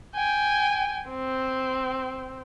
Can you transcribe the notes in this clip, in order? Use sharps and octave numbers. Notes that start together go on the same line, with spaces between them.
G5 G#5
C4